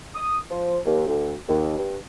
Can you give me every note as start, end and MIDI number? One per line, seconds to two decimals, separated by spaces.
0.15 0.38 87
0.50 0.78 53
0.85 1.05 39
1.07 1.34 38
1.48 1.73 39
1.77 1.95 43